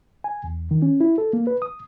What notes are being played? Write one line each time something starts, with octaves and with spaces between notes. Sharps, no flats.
G#5
E2
D#3
C#4
E4
A4
A#3
B4
D#6